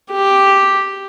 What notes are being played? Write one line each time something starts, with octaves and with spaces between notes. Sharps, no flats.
G4